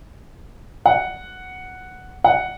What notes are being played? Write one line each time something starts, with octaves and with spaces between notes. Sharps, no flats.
F#5
F#5